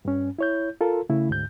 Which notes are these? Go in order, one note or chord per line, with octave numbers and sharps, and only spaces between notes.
G2 C#4
E4 C#5 G6
F4 A4 A#4
C#3 A3 E4
D2 G#2 G6